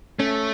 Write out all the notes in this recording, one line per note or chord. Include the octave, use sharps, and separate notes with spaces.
A3 C#4